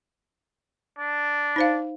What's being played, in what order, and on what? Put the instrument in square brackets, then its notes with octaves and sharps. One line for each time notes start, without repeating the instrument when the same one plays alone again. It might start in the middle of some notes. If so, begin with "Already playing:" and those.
[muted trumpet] D4
[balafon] D#4 C5 F5